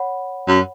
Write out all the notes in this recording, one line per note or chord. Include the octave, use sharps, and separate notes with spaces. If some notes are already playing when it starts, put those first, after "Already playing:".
Already playing: C#5 F#5 B5
F#2